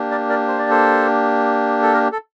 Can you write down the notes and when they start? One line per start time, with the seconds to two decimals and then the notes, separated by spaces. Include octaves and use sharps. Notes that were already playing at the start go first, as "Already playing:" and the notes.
Already playing: A#3 D4 G4
0.11 A#4 D5
0.29 A#4 D5
0.48 C5
0.59 D5
0.70 A4 C5
1.82 A4
1.94 A#4
2.12 A4